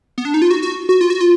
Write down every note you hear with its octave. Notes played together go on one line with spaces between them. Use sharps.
B3
D4
D#4
F4
F#4
F#4
F#4
F4
F#4
F4